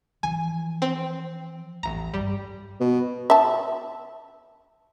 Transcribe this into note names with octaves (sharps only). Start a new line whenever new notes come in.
E3 F3 G#5
C4
A1 E2 A#5
G2 G3
B2
E5 A5